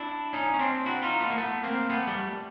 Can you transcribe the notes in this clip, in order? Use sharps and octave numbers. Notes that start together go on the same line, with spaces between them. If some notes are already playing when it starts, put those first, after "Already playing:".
Already playing: D4 E4
C#4 D#4
C#4
C4 D4
E4 F#4
D#4 F4
A3 B3
A#3
A3 B3
A#3 C4
A3 B3
G3 A3